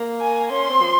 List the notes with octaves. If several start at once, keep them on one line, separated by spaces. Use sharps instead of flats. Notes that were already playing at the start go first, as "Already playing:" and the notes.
Already playing: A#3
G#5
C#4 C6
C4
F3